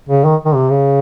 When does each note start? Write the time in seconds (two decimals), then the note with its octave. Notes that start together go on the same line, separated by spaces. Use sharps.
0.09 C#3
0.25 D#3
0.45 D#3
0.55 C3
0.71 C#3